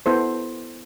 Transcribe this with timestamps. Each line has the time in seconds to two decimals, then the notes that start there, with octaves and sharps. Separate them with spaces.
0.06 B3 E4 A4 C5